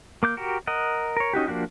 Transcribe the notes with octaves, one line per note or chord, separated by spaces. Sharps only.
A#3 D6 G6
F#4 G4 A#4
A#4 D#5 F#5
A#4 C#5
C#4 D#4 F#4 G4
F3 A#3 D4 F#4 G4